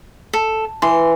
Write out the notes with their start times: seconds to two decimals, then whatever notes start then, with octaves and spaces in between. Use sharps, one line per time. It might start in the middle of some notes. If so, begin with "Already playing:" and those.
0.33 A4
0.82 E3 C6